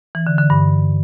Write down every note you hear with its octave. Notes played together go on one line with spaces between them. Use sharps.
E3
D3
D3
G2